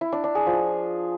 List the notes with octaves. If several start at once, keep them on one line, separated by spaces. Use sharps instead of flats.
E4
D4
D4
G#4
F3